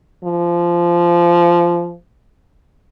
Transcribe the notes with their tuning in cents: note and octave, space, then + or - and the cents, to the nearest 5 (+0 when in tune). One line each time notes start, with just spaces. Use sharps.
F3 -15